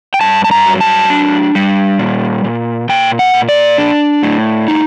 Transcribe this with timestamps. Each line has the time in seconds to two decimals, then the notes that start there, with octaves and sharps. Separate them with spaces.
0.14 G5
0.21 G2 A5
0.44 A5
0.51 A#5
0.66 F#3
0.81 A5
1.10 D4
1.55 G3
1.99 A#2
2.44 A#2
2.89 A#2 G5
3.19 F#5
3.34 A#2
3.49 D5
3.78 D4
4.23 A2
4.68 D#4